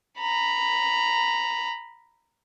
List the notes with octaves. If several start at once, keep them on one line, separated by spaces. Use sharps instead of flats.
A#5 B5